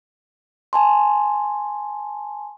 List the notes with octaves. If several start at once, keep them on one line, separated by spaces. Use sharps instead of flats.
G#5 A5 C6